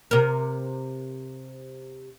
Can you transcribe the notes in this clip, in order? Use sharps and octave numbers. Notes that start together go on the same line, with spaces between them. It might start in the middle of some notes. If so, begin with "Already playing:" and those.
C3 A#4